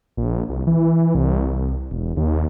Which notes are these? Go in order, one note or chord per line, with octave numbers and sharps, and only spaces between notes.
A#1
C2
E3
C2
E1
D#2